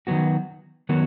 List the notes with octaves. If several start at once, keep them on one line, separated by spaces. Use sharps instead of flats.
D#3 F#3 B3 F#4
D#3 F#3 B3 F#4